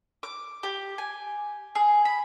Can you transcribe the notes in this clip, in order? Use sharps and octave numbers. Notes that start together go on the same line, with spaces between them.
D6
G4
G#5
G#4
B5